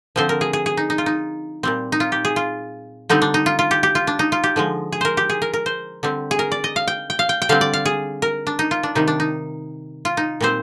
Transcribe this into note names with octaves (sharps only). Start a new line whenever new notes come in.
D3 F3 C4 C5
A#4
G#4
G#4
G#4
D#4
D#4
F4
D#4
A#2 G3 C4
D#4
F4
G4
G#4
F4
D3 G3 C4 D#4
D4
D#4
F4
F4
G4
G4
F4
D4
D#4
F4
G4
D3 F3 G#3
G#4
A#4 C5
G4
G#4
A#4
A#4
C5
D3 G3 C4
G#4
A#4
D5
D#5
F5
G5
G5
F5
G5
G5
D3 G3 C4 F5
D5
F5
G#4
A#4
D4
D#4
F4
D4
C3 D#3 G3 D#4
D4
D#4
F4
D#4
A#2 G3 C4 C5